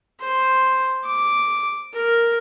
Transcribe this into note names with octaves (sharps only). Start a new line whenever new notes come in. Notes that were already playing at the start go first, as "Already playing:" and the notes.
C5
D6
A#4